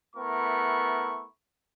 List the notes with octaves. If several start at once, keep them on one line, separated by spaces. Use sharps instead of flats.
A3 B3 E4 A#4 C#6